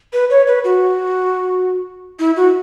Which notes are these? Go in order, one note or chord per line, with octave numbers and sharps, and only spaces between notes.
B4
C#5
B4
F#4
E4
F#4